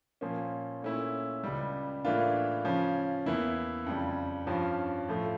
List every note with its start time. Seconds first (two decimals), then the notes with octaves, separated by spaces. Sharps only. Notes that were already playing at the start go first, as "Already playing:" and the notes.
0.21 A#2 F3 A#3 C#4
0.82 A#2 A3 C#4 E4
1.44 C#2 C#3 G3
2.04 A2 E3 A#3 D4 F4
2.65 C#3 F3 C#4
3.26 E2 E3 A#3 E4
3.86 F2 C#3 G3
4.47 G2 F3 C#4 F4
5.09 A2 F3 A3